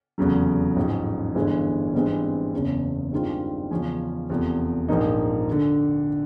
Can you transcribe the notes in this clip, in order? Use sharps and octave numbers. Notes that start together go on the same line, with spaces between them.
F1 E2 C#3 F#3
A1 G#2 F3
G1 G2 E3 G#3
G#1 G2 E3 G#3 C4
F#1 E2 C#3
G2 D#3 G#3 C4 F4
E2 C#3 F3 G#3 C#4
F1 E2 C3 F3
A#1 G#2 F3 A#3 D#4
D3